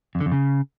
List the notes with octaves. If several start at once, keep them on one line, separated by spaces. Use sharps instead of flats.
F2
D3
F2
C#3